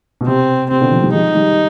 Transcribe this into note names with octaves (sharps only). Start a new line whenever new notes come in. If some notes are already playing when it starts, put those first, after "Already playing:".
B2
C3 C4
C3 C4
B2 D3
D3 F3
D#3 G3
F3 G#3 D#4
D#3 G3